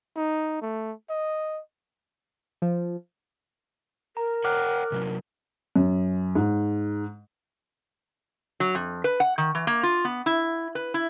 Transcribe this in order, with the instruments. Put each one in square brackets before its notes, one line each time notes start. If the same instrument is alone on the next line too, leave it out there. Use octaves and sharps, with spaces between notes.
[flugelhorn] D#4
A3
D#5
[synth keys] F3
[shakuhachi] A#4 [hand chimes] A#5
[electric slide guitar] C#5 F#5 G5 [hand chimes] D6 F6 F#6
[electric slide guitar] C3 F#3 C#4
[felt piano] F#2
G#2
[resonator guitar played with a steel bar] F#3
F2
B4
F#5
D#3
E3
A#3
F4
B3
E4
B4
E4